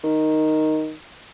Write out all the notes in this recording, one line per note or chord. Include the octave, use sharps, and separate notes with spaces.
D#3